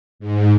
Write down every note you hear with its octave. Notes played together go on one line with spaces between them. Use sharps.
G#2